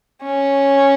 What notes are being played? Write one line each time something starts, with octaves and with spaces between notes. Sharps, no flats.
C#4